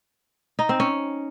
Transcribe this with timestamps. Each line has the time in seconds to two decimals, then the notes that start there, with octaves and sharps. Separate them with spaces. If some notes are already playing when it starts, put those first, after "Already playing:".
0.59 D#4
0.69 C4
0.80 C#4